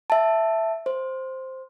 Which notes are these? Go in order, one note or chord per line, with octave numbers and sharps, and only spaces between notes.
E5 A5
C5